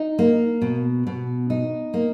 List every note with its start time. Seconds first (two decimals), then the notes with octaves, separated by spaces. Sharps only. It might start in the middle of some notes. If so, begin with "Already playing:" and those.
Already playing: D#4
0.19 A#3
0.62 B2
1.07 B2
1.50 D#4
1.94 A#3